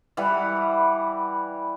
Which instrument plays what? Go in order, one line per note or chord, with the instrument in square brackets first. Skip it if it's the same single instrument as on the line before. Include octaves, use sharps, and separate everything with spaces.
[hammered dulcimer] E3 G3 B4 F#5